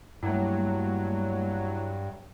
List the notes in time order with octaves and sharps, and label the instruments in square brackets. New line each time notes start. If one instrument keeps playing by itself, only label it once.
[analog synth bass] G2 [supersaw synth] F#3 [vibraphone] G3 A3 A#3 [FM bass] E4